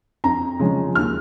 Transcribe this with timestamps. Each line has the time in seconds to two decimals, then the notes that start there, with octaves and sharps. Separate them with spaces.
0.24 F2 A#5
0.59 C#3 F3 G#3 C#4
0.95 D#2 F6